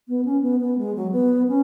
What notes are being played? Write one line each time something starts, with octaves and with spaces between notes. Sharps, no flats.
B3
C#4
B3
B3
G#3
F#3
B3
C#4